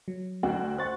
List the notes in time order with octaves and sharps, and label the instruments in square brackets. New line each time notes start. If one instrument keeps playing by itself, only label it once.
[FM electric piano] F#3
[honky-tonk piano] D2 F#4 G5
[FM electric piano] C5 A6 [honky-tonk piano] F#5 C#6 F#6